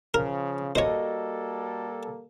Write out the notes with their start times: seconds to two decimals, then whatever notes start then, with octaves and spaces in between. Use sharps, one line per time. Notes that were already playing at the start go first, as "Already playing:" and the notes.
0.14 C#3 F3 A#4
0.75 G3 A#3 F#4 A4 C5 C#5 D#5